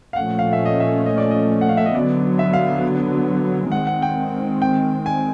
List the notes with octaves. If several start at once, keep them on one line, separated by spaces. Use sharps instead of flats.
F5
A#2 F3 A3 C#4 F#5
F5
E5
D#5
E5
D#5
D5
D#5
F#5
F5
E5
D#5
D3 F#3 B3 D5
E5
F5
D#3 G#3 C4 F#5
F#5
G5
G5
G#5